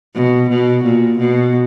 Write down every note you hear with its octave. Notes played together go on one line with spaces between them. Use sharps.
B2
B2
A#2
B2